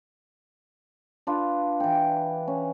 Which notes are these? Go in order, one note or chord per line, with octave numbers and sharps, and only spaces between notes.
D4 F4 B4
E3 G5
C#4